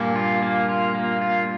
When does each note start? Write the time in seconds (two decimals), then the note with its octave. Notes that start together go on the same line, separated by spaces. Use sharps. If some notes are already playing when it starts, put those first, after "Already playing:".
Already playing: G2 A#2 A#3
0.16 F4
0.42 A#3
0.69 F4
0.95 A#3
1.21 F4